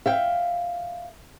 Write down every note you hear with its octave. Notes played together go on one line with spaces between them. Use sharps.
E5 F5 G5